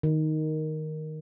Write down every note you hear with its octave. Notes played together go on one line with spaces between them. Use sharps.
D#3